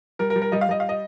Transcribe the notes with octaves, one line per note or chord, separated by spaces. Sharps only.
G3 A#4
A#4
G3
A#4
G3 D#5
F5
G3 D#5
F5
D#5